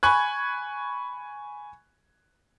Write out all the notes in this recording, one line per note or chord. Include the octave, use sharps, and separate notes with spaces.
G#5 B5 C#6 F#6 G#6